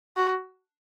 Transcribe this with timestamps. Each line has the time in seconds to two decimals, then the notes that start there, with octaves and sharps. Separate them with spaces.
0.17 F#4